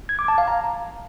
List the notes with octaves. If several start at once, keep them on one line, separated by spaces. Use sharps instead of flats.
G#6
D6
A5
F5
A#5